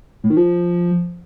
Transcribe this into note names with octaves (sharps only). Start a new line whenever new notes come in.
A2
D#3
F3